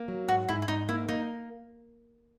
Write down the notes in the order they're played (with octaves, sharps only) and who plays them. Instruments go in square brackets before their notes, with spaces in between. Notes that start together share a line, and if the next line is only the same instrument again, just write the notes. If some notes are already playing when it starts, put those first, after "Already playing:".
Already playing: [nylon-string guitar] A#3
F#3
[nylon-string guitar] G#2 [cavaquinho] F#4
[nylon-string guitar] G#2 [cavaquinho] E4
[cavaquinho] E4
[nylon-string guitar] G#2 [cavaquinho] D#4
[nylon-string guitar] A#3 [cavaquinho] E4
[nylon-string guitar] A#3 [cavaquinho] D#4